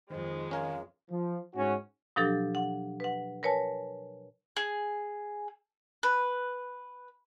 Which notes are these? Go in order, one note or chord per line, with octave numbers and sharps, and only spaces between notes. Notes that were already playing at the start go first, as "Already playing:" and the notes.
F2 D#3 G#3 C5
C#4 A#4 F5 G#5
F3
G#2 C#4 F#4
B2 F3 F#3 D4 G4 A4
F#5
B4 F#5
A#4 B4 C#5 G#5 A5
G#4
B4